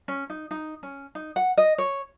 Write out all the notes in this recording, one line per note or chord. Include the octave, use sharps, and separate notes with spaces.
C#4
D#4
D#4
C#4
D#4
F#5
D#5
C#5